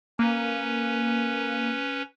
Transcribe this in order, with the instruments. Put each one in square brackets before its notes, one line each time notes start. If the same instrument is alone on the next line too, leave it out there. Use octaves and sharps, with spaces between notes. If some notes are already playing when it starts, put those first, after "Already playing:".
[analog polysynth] A#3 [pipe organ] C#4 B4